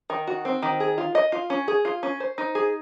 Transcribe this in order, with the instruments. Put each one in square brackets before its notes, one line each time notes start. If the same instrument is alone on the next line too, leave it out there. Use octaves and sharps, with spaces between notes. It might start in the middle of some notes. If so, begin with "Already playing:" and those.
[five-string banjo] D#3
F#4
C4
D#3
G#4
F4
D#5
F4
C#4
G#4
F4
C#4
C5
D#4
G#4